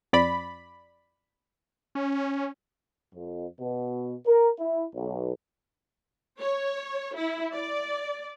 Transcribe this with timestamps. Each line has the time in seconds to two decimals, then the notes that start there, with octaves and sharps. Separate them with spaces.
0.13 F2 D5 B5
1.95 C#4
3.14 F2
3.60 B2
4.26 A#4
4.60 E4
4.94 B1
6.39 C#5
7.16 E4
7.53 D5